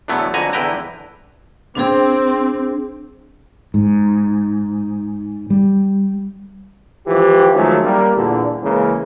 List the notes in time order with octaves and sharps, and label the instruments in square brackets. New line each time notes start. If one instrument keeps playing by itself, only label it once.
[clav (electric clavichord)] E2 A2 D3 F#3 A3 B3
F2 D3 F#4 B4 G#5 A#5
E2 D3 E4 B4 G5 A#5
[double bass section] C4 [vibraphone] D4 G#4
[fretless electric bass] G#2
G3
[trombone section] G#1 E3 F3 G4
D#3 F3 F#3 G#3 A3 C#4
G3 A#3
E2 A#2 D3
C#3 E3 G#3 A#3